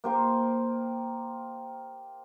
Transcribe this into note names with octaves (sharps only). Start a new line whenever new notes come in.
A#3 G4 C5